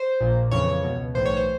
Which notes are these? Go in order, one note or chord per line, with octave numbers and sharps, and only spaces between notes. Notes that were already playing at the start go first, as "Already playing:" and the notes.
Already playing: C5
A#1 A#2
F2 C#3 E3 C#5
C#2 B2
B1 A2 E3 C5
C#5
C5